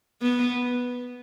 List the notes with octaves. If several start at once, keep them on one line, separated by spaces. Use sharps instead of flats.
B3